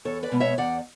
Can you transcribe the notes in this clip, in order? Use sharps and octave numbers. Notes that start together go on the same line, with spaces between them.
E2 A4 C#5
B4 D5
B2 G#3 B3
C#5 E5
E2 D5 F#5